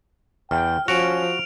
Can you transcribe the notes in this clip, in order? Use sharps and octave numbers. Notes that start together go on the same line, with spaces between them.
E2 G5 F6
F3 C#4 F#4 D7 F7